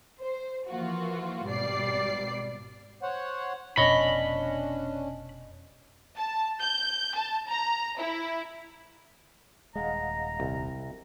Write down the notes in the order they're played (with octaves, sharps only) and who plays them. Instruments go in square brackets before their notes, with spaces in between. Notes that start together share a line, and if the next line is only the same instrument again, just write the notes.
[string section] C5
E3 F3 A#3 F4 F#4
G#1 B2 G3 D5 C7
[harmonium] C5 C#5 F#5
[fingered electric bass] F1 B2 [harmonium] C#4 D4 [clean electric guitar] C#5 D#5 [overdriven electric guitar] B5
[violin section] A5
G6
A5
A#5
E4
[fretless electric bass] D#1 G#3 [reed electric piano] D#5 F5 F#5 [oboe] A#5
[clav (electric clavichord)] C2